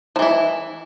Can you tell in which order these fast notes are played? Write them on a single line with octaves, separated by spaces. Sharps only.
F3 E3 E4